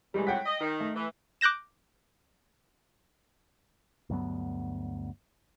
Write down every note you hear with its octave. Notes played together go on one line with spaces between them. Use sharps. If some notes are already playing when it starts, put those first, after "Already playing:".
D#2 D#3 E3 G3 G#3
F2 A2 F#5 G5 B6
D#5
D#3
A3
E3
D6 F#6 G6 A#6 E7
D2 G2 F#3 B3